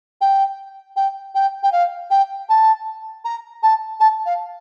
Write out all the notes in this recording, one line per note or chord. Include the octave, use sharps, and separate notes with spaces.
G5
G5
G5
G5
F5
G5
A5
A#5
A5
A5
F5